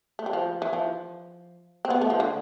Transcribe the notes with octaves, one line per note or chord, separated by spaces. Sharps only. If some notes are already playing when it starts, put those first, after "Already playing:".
A3
G3
F3
E3
F3
C4
B3
A3
F3
D3